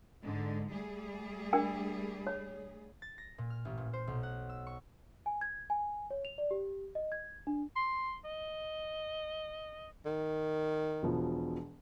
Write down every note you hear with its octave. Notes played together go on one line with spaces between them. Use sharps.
G#2 D3 G#3
G3 A3 G#4
D4 A#4 G5
C#5
A6
A#6
A#2
F6
A1
A#2
C5
B1
F#5
E6
C#6
G#5
G#6
G#5
C#5
F7
D5
G4
D#5
G#6
D4
C6
D#5
D#3
E1 B2 F3